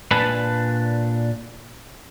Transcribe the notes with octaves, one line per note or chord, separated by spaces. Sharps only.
A#2 D4 B4 G#5 A5 B5